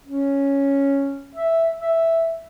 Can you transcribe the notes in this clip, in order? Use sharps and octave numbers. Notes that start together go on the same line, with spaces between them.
C#4
E5
E5